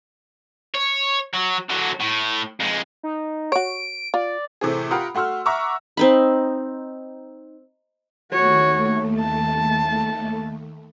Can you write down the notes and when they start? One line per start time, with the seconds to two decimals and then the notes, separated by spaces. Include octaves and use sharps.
0.74 C#5
1.34 F#3
1.70 D3 F#3
2.01 A2
2.60 F2 G#3
3.03 D#4
3.52 F#4 C#5 D7
4.14 F4 D5
4.61 A2 C3 E3 A3 C4 G#4
4.91 F4 G4 A#4 F#5 B5 D#6
5.15 A3 F#4 C6 E6 F6
5.46 E5 F#5 A#5 C#6 D6 E6
5.97 C4 D#4 B5
8.33 D#2 A3 F#4 C#5
9.20 A5